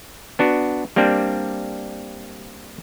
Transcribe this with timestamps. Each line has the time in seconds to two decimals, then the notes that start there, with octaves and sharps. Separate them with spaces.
0.39 B3 D4 F#4
0.96 G3 A#3 C4 D4